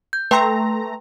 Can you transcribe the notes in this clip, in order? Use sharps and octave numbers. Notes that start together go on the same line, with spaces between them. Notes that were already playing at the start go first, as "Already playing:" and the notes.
G6
A3 B4 G5 A#5 C6